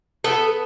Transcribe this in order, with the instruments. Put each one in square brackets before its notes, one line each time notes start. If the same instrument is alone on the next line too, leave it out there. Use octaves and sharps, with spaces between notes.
[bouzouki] B3 A4